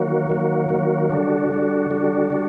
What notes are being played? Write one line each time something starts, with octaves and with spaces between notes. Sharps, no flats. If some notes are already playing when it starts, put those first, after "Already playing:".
Already playing: D#3 F#3 A#3 F#4
D#3 F#3 A#3 F#4
D#3 F#3 A#3 F#4
D3 G3 D4 F#4
D3 G3 D4 F#4
D3 G3 D4 F#4
G3 D4 F#4